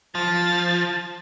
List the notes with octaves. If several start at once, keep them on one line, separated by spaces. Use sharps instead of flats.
F3 A6